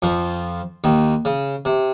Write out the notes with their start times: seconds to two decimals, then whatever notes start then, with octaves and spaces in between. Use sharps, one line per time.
0.02 F2 F3
0.84 D#2 D#3
1.25 C#3
1.65 C3